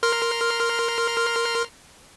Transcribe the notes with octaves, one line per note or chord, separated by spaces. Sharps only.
A#4 C6 F6